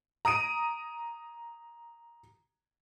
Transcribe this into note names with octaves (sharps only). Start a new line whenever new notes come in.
A#5 D#6 D7 D#7